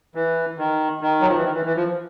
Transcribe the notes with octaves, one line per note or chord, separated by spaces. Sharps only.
E3
D#3
D#3
F#3
F3
E3
D#3
E3
E3
F3